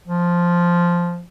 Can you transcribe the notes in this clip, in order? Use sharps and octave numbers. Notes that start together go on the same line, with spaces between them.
F3